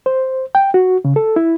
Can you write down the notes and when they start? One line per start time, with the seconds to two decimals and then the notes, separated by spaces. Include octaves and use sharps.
0.06 C5
0.55 G5
0.74 F#4
1.05 C#3
1.16 A4
1.36 E4